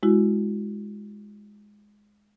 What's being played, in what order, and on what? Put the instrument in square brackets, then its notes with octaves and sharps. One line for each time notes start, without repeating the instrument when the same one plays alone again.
[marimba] G#3 E4 F#4